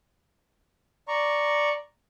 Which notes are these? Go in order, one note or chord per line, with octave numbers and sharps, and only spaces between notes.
D5 A#5 C#6